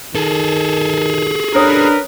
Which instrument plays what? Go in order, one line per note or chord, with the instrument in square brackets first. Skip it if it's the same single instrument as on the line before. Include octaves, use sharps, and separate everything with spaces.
[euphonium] D#3 [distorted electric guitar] G#4 A4
[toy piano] C#4 C#5 D#6 [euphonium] D4 [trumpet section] A#4 B4